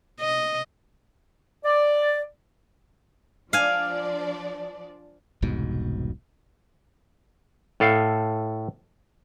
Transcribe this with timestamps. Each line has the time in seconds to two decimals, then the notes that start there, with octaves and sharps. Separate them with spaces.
0.20 D#5
1.65 D5
3.53 F3 D4 D5 F5 G#5
5.42 E1 C2 G#2 B2
7.80 A2 A4 F5